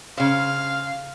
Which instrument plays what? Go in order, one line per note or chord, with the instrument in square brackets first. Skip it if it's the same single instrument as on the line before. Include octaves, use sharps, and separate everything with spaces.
[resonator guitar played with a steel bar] C#3 C5 [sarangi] F5